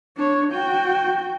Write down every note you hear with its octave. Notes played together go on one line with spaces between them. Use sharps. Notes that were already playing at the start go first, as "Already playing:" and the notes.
D4 C#5
F#4 G5